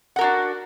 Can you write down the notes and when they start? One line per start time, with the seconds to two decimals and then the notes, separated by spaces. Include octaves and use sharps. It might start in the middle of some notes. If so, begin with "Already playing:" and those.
0.16 F#5
0.19 A#4
0.21 F#4
0.24 D4